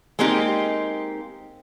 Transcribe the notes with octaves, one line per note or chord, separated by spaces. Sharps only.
G#3 A#3 C4 D#4 G4